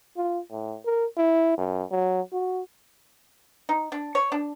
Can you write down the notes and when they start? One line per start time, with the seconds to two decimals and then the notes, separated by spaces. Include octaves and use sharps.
0.17 F4
0.51 A2
0.85 A#4
1.17 E4
1.58 F#2
1.91 F#3
2.33 F#4
3.69 D#4
3.92 D4
4.15 C#5
4.32 D4